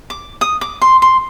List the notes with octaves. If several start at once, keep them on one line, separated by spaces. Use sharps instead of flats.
D6
D#6
D6
C6
C6